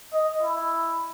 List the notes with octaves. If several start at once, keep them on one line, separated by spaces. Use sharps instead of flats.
D#5
E4